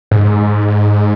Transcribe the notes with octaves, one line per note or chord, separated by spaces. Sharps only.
G#2